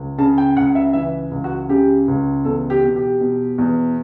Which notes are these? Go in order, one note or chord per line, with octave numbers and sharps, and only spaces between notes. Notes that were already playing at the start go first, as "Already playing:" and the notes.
Already playing: C#2
C#3 A5
G5
C#2 F#5
E5
E3 E5
C#2
F#4
C#3 G4
C#2
E2 A4
G4
B2
G4
B2
E2